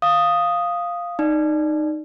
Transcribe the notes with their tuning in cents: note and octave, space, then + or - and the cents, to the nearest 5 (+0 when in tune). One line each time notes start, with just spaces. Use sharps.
F5 +0 D#6 +0
D#4 -15 D5 +0